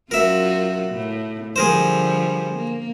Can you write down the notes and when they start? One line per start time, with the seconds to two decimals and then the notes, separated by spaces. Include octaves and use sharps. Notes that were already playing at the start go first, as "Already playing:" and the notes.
0.11 F#2 F4 F#4 A#4 E5
0.90 A2
1.56 D3 F3 G3 G#4 A#4 C5
2.55 A#3